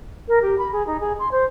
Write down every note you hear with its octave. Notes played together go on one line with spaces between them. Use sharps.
A#4
G4
B5
G#4
D#4
G#4
C6
C5